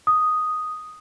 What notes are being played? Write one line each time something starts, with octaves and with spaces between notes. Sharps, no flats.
D#6